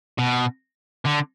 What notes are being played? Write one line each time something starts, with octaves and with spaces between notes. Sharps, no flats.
B2
D3